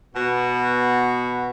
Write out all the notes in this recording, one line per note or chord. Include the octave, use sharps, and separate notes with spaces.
B2 B3 F#4